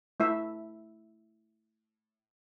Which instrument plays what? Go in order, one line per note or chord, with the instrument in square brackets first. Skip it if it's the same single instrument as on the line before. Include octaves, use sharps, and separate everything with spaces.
[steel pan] A3 E4 E5